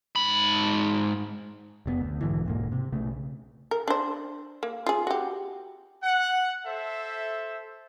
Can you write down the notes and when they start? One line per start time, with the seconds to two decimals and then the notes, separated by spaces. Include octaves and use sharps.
0.16 G#2 B5
1.86 F1 B2 B3
2.01 D2
2.21 B1 G#2 D3 E3
2.46 E1 G#2 A#3
2.72 C3
2.92 B1 C#3 A3
3.71 A#4
3.88 D4 C5
4.63 A#3
4.86 F4 G#4
5.07 F#4 G4
6.03 F#5
6.67 A4 C5 E5